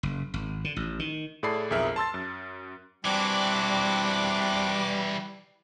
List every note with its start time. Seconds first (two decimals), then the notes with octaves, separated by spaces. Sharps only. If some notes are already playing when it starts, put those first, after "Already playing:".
0.03 F#1
0.34 G#1
0.65 D3
0.76 A1
0.99 D#3
1.43 A2 G#4 A4 D5 B5 C7
1.71 B1 F2 G#4 A#4 E5 F6
1.96 A5 C6 E6 A6
2.14 F#2
3.05 E3 G3 C4 D4 F#4 D6 F#6